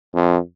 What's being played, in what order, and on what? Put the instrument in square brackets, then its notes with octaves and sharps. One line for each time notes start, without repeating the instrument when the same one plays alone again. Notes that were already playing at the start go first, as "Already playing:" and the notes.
[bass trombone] F2